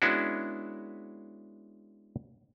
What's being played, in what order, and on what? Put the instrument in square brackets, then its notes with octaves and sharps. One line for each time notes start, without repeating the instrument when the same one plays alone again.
[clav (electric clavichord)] G#3 B3 C#4 D4 E4 F#4